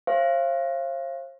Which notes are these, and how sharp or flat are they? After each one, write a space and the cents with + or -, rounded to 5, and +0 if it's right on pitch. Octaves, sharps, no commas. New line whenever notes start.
C5 +40 F5 -30